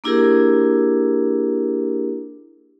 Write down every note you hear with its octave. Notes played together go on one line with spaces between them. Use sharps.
A#3 D4 E4 G4 G#4 A#4